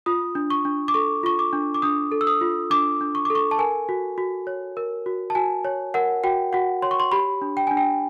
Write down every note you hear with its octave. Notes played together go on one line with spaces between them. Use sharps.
F4 D#6
D4
C#6
D4
D6
A4 C#6
F4 C#6
D6
D4
D6
D4 D#6
A4
E6
D#6
F4
D4 D6
D4
C#6
A4 D6
C#6
A5
A#4 G#5
F#4
F#4
C#5
A#4
F#4
A5
F#4 G#5
C#5
A#4 F#5
F#4 G5
F#4 F#5
C#5 C6
C#6
C6
G4 B5
D4
G5
D4 G#5
G5